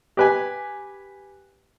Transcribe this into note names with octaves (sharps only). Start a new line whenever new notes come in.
G4 B4 G#5